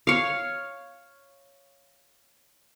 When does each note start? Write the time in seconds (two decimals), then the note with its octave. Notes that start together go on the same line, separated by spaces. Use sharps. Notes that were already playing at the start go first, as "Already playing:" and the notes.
0.07 C#5 F5